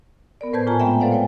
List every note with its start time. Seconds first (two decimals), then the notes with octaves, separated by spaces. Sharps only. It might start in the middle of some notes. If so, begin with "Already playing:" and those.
0.41 B3 A#4 D5
0.53 A2 B4 C5 A5 G6 G#6
0.66 A#2 F4 G#5 A#5
0.79 G#3 A3 B3 C4 E5 G5
1.00 A4 B4 C5 D5 F5 F#5
1.12 C#5 G5 G#5